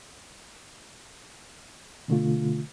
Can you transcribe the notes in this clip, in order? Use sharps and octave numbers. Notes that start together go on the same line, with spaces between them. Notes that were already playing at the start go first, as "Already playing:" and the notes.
B2 D3 A3 F4